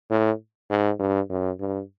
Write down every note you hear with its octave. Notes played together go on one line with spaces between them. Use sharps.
A2
G#2
G2
F#2
G2